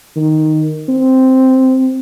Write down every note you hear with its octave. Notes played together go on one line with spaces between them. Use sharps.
D#3
C4